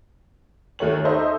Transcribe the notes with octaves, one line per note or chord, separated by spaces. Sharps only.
D#2 A3 C#5 F#7
D#4 A4 C5 D#5 E5